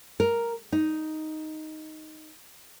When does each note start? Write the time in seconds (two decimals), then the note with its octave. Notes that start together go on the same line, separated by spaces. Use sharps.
0.20 A#4
0.72 D#4